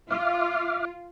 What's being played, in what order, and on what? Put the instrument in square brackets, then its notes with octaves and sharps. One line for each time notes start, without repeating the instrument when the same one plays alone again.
[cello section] F4 [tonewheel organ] E5 D6 F6